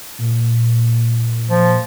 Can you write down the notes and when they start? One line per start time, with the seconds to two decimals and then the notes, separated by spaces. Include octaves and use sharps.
0.18 A#2
1.50 F3